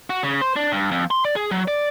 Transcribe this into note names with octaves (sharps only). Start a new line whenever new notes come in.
F#4
C#3
C5
D4
G2
F2
C6
D5
G#4
F#3
D5